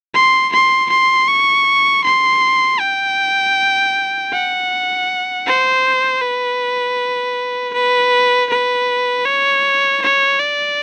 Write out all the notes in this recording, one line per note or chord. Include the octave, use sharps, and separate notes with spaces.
C6
C6
C6
C#6
C6
G5
F#5
C5
B4
B4
B4
C#5
C#5
D5